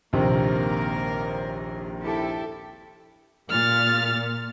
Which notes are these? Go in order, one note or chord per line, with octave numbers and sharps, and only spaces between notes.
A#1 D#2 C3 A#3 A#4
E4 G4 A4
A#2 F6 A6